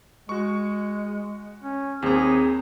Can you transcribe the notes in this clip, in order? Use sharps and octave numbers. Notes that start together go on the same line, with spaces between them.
G#3 F#4 C#6
C#4
D#2 C4 G#4 C5 A#5